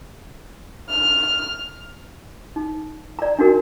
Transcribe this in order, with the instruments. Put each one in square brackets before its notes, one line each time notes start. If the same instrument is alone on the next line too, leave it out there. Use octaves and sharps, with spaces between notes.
[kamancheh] F6
[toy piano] D#4
D5 A#5
D4 D#4 F#4 A#4